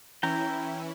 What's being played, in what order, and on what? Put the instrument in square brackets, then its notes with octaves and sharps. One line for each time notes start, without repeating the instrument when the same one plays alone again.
[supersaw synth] E3 C#4 E4 [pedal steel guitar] G5 A#5